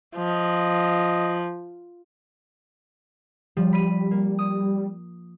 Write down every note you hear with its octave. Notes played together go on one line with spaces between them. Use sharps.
F3 D#5
F3 G3
B5 D#7
A#3
D#6